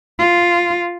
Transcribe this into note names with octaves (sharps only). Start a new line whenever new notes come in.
F4